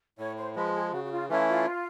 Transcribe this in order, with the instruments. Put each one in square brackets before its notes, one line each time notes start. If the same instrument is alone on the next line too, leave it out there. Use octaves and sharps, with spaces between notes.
[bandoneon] A2 [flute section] C#5
[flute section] C5
[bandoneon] F3 G#3 [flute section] B4
[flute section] G#4
[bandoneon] C#3 [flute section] F#4
[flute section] F#4
F4
[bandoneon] E3 A3 C#4 E4 [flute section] F4
[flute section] F4